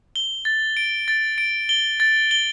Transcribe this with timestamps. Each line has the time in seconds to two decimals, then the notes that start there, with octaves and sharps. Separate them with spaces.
0.16 G7
0.45 A6
0.77 D7
1.08 A6
1.38 D7
1.69 G7
2.00 A6
2.31 G7